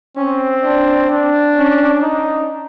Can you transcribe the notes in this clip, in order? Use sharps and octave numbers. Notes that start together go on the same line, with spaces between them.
C4 C#4
D4
D4
C#4
D#4